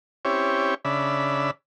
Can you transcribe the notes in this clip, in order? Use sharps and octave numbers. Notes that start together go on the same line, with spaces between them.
C4 C#4 E4 G4 C#5
C#3 D4 E5 B5